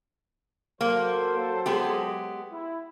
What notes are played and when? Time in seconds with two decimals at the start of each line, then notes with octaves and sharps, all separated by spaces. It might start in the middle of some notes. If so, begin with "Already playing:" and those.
0.81 F#3 A#3 A4 C5
1.66 G#3 B3 G4
2.51 E4